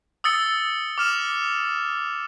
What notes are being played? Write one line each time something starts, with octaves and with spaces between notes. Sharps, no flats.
D#6 E6 A6 C#7
D6 F6 E7